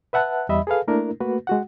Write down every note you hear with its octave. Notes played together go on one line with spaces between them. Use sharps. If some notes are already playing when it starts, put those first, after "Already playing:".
B4 E5 F#5 A5 F#6
E2 G3 D#5 E5 B5
G#4 A4 B4 F5
A3 A#3 D4 E4 A#4
A3 A#3 F#4 B4
G#3 F#4 F#5